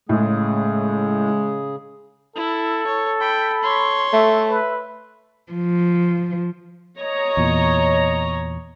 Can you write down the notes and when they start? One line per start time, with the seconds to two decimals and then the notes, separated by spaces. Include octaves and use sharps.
0.09 A2 C#3 G#3 G#4
2.36 E4 A4
2.86 C#5
3.21 G5 B5
3.63 C#5 C6
4.13 A3 E5
4.49 B4
5.50 F3
6.99 C#5 D#5 A#5
7.37 E2 A#2